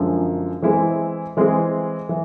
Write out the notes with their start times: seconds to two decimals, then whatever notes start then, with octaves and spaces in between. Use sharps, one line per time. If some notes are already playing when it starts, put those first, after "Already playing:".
Already playing: F#2 D3 F3 G#3
0.62 E3 G#3 C4 E4 G#4
1.37 E3 G#3 C4 E4 G#4
2.09 E3